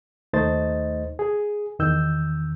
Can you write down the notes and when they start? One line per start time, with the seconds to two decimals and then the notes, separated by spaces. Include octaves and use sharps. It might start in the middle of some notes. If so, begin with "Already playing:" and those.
0.33 D#2 A3 D#4 C5 D#5 A6
1.19 G#4
1.79 E2 D#3 E6 G6